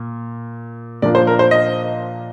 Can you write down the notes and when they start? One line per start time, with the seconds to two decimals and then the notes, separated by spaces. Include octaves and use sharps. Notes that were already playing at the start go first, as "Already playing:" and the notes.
Already playing: A#2
1.02 A#2 F3 A#3 D4 F4 D5
1.15 C5
1.27 A#4
1.39 C5
1.51 D#5